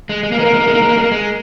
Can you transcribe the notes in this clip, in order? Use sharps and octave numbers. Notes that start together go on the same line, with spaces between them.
G#3
G#3
A#3
G#3 A#4
A#3
G#3
A#3
G#3
A#3
G#3
A#3
G#3
A#3
G#3